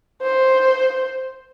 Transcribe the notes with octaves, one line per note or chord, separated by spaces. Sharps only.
C5